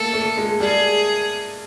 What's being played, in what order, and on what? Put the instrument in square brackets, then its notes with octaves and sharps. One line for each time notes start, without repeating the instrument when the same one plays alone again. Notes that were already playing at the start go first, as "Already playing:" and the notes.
Already playing: [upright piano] A3 A#3 [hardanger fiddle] A4
[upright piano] A3
G#3
[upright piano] G3 [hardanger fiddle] G#4